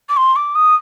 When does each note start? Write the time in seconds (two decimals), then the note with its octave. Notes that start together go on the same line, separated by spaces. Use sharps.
0.09 D6
0.17 C6
0.36 D6
0.55 D#6